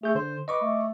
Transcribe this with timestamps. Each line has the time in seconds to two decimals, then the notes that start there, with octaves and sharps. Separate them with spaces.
0.03 A3 G#4 G6
0.15 D3 C5
0.48 B4 D#5 C#6 D6
0.62 A3